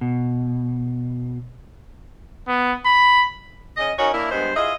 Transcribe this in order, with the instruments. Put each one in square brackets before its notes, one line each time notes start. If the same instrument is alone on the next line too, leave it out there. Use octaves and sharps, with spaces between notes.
[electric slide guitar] B2
[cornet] B3
B5
[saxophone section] C#3 C#4 D#5
C#4 D#4 F#4 A#4 C#5
A#3 D4 E4
G2 G#3 B3 C5
E4 F4 G#4 D#5